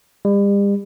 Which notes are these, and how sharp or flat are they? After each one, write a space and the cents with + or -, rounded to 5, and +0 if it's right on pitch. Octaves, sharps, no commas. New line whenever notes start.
G3 +40